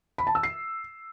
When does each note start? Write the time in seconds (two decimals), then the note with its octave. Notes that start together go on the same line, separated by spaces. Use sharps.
0.18 B5
0.27 A5
0.35 E6
0.43 C7